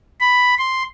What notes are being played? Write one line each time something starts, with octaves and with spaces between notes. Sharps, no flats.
B5
C6